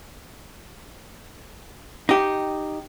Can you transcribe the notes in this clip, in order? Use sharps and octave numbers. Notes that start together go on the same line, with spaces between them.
D#4 G4